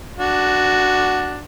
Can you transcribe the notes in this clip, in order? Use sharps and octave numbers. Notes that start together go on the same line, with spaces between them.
D4 F#4